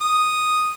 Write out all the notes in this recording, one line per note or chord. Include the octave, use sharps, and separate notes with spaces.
D#6